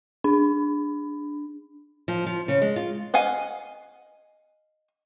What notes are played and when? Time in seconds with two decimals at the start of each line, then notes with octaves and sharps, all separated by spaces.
0.24 D4
2.08 F3
2.26 F3
2.48 C#3
2.62 G#3
2.76 F4
3.14 D#5 F5 F#5 G#5